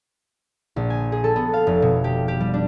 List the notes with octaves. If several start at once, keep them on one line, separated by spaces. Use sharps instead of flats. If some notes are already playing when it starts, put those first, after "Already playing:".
A#1
G#5
G#4
A4
B3
F5
F1
B2
G4
G4
G3
D4